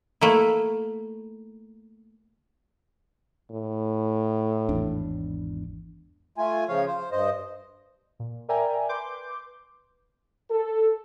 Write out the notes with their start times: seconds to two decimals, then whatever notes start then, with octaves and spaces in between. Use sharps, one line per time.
0.21 A3 A#3 E4
3.51 A2
4.69 G#1 E2 D4
6.38 A3 F4 G#5
6.68 C#3 F3 C#5 F5
6.87 C5
7.12 G2 C5 D#5
8.20 A#2
8.49 A#4 D5 E5 G5 G#5 A#5
8.89 B4 C6 D6 G6
10.51 A4